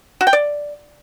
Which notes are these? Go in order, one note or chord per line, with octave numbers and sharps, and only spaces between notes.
F#4
G5
D5